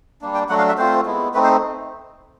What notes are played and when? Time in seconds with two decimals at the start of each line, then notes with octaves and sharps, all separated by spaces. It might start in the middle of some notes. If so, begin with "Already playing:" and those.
0.21 G3 A#3 D4
0.34 G5
0.49 F#3 A3 D4 F#4 F#5
0.58 F5
0.69 E5
0.78 A3 C4 F4 C5
1.06 G#3 B3 E4
1.34 A3 C4 D#4 B4
1.44 C5